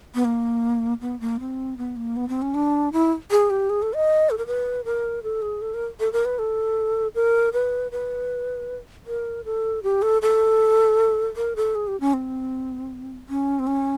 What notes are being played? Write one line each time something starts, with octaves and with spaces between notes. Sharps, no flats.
B3
A#3
B3
A#3
C4
B3
A#3
B3
C4
C#4
D4
E4
G#4
G4
G#4
A4
D#5
A4
A#4
B4
A#4
A4
G#4
A4
A#4
A4
A#4
B4
A4
A#4
B4
B4
A#4
A4
G4
A4
A4
A#4
A4
G#4
G4
C#4
C4
C#4
C4
C#4